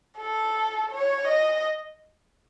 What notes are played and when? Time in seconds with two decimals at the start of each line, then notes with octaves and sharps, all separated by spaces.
0.18 A4
0.91 C#5
1.28 D#5